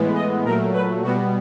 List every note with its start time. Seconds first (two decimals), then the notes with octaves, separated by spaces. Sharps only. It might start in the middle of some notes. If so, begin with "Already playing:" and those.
Already playing: A2 E3 G#3 B3
0.15 D#5
0.45 A#2 F#3 A3 A#4
0.73 B4
1.03 B2 G3 B3 F#4